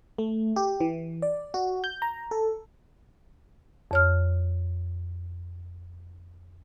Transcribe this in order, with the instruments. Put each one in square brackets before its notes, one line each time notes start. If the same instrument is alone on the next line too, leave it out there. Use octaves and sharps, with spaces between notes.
[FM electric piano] A3
G4
E3
D5
F#4
G6
A#5
A4
[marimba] F2 C#5 F6